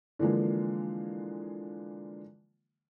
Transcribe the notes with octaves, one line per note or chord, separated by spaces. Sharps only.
D3 E3 F3 G#3 A#3